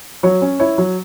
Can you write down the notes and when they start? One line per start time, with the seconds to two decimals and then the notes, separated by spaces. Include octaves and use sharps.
0.23 F#3 C#5
0.42 C#4
0.60 E4 C#5
0.78 F#3